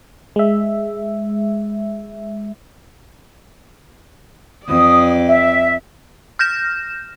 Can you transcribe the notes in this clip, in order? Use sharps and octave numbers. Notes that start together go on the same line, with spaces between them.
G#3 E5
F2 D5 D#6
E5
F6 G6 A#6 E7